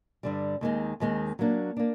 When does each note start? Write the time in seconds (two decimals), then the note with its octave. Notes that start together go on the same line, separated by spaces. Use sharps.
0.23 G2 D3 G3
0.61 D#2 D#3 G#3 C4
1.00 D#2 D#3 G#3 C4
1.39 F#3 A#3 D4
1.77 A#3 D4